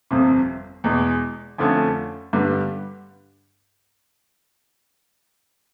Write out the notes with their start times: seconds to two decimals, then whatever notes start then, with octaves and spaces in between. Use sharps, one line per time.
0.11 G1 F2 C3
0.84 E2 B2 G#3
1.58 F2 D3 F3 A3 C#4
2.33 G2 D3 G3 B3